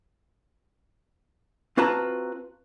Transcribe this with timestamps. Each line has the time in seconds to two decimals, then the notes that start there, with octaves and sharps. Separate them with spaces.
1.77 C4 F4 F#4 B4 A5 A#5